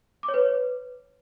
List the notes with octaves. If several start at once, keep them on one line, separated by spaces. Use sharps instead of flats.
D6
C#5
B4